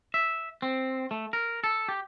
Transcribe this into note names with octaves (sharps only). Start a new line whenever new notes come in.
E5
C4
A3
A#4
A4
G4